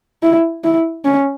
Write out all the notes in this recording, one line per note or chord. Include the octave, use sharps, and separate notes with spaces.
E4
E4
C#4